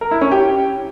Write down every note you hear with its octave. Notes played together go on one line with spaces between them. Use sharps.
A#4
E4
C#4
G4